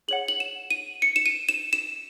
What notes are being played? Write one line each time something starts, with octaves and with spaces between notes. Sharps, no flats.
G#4 C#5 F#5 F#7
F#7
E7
D#7
C#7
E7
D#7
E7
E7